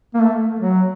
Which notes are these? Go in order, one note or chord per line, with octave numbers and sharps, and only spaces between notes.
A#3
A3
F#3